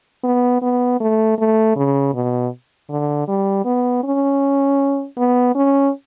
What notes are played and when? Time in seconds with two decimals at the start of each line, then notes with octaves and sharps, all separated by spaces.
0.24 B3
0.62 B3
1.00 A3
1.38 A3
1.76 C#3
2.14 B2
2.90 D3
3.28 G3
3.65 B3
4.04 C#4
5.17 B3
5.55 C#4